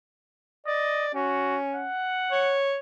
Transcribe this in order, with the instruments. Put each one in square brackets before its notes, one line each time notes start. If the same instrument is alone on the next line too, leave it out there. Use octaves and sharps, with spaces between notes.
[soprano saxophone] D5 [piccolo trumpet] D#5
[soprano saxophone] C#4 [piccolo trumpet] F#4
[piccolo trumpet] F#5
[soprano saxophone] C#5